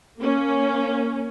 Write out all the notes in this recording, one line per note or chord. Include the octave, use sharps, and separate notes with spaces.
A#3 C#4